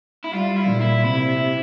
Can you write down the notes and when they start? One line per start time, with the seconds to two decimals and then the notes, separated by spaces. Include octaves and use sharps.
0.24 E4
0.33 G3 F4
0.57 E4
0.69 A#2
0.81 E4
1.04 C3 E4